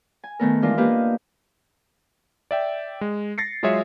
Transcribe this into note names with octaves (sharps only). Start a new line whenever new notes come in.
G#5
D#3 A3 B3 A#4
E3 G#3 D4 F4 A#4
A#3 D4 G4 B4 D#5
D5 E5 G5
G#3
A6 A#6 C7 C#7
F#3 G#3 F4 G#4 C#5 E5